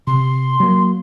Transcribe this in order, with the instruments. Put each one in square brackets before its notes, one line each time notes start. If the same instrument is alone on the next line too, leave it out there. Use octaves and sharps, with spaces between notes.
[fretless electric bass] C3 [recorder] C6
[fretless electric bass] F#3 A#3